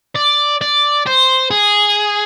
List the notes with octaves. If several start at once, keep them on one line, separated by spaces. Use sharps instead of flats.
D5
D5
C5
G#4